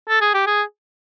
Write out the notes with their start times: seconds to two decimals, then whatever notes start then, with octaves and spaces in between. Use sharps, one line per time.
0.09 A4
0.21 G#4
0.34 G4
0.47 G#4